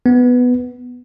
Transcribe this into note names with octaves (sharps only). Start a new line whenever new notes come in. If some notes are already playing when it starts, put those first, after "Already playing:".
B3